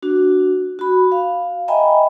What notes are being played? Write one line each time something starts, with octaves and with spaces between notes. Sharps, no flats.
D4 F#4
F#4 B5
F5
D#5 E5 G5 G#5 A#5 B5